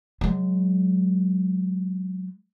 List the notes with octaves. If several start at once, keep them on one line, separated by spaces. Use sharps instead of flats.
F#3 G#3